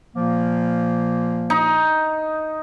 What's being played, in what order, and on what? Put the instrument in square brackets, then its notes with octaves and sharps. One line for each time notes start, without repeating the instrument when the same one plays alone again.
[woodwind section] A#2 F3 A#3
[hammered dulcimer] D#4